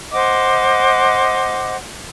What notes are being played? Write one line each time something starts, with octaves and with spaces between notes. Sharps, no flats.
C5 D#5 F#5 D6